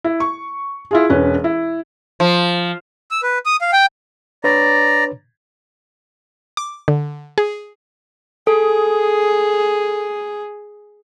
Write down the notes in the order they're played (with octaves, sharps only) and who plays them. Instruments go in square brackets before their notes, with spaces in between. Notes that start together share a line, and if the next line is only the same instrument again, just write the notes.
[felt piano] E4
C#6
E4 F4 G#4
E1 C#4 B4
E4
[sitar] F3
[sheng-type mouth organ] E6
B4
D#6
F5
G5
[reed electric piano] D4 B4 C#5 [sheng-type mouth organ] D5 A#5
[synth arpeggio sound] D6
D3
G#4
[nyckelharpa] G#4 [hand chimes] A4